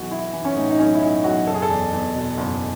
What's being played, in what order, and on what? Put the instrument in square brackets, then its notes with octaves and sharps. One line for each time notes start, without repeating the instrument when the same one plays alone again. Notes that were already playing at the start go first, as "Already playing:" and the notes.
Already playing: [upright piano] B1 E3 F#4
E3 E4
E3
C#4
A2 D#4
D#4
B1 C#4
E4
B1 D#4
B1 F#4
F#1 A4
G#4
A4
E2
E2
B2
F#1